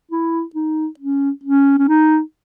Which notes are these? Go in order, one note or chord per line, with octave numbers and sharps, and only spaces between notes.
E4
D#4
C#4
C#4
C#4
D#4